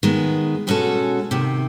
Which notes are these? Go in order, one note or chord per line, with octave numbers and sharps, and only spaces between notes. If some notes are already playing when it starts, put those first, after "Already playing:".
D#3 G#3 B3
B2 G#3 C#4 F#4 A4
E2 C3 D#3